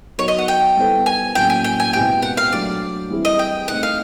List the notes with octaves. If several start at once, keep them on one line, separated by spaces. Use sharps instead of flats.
F#3 B3 D#4 F#4 C#5
D#5
F#5
G5
G3 B3 E4 A4 C5
G#5
A2 F#3 A#3 C#4 G5
G#5
G5
G#5
B2 G#3 C4 E4 G4 G5
F#5
F5
F#3 A3 D4 D5
E3 G3 C4 E4 G#4
D#5
G5
A3 C4 D#4 F#5
F5